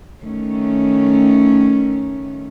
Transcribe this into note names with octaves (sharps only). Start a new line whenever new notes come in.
D#3 A3 C#4